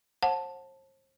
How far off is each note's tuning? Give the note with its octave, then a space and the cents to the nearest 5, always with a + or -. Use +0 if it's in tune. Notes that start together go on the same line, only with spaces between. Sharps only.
C5 +40 F#5 -20 A5 +0